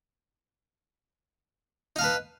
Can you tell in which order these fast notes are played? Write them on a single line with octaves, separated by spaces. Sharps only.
D#4 F5 A5 B4